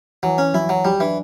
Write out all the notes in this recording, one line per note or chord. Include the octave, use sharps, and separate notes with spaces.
E3 F#3
C#4
F#3 E4
F#3
F#3 G3
E3 D4